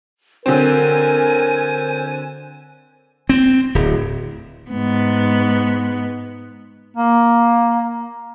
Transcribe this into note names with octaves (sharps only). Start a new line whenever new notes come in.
D3 F#3 C4 A#4 C5 G#5
C4
D1
G#2 B3
A#3